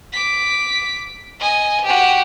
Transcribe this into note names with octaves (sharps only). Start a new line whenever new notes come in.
D6 B6
D#5 G#5
F#4 G4